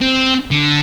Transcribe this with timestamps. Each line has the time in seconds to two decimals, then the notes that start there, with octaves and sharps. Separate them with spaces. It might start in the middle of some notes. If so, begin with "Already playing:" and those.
0.01 C4
0.51 D3